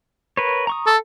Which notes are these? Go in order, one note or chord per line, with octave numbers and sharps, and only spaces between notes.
A#4 B4 C#5
A#5 C#6 D#6
A4